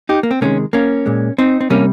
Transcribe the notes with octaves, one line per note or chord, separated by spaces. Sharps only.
D#4 G4
A#3
C4
C3 D#3 G#3 A#3 C#4
A#3 C#4
A#2 G#3
C4 D#4
C4
C3 G3 A#3 C#4